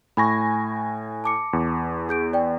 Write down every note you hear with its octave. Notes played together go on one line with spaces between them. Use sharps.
A2 G#5 B5 C#6 A#6
A5 D6 C#7
E2
G#4 G6 D7
D5 G5